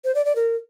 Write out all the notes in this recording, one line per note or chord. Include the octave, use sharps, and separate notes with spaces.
C5
D5
D5
A#4